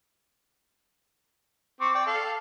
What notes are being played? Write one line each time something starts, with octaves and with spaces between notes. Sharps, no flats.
C4 C#6 D6
D5 G5
A4 F5